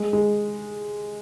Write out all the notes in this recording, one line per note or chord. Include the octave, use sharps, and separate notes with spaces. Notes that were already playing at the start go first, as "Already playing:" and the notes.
Already playing: G#3
G#3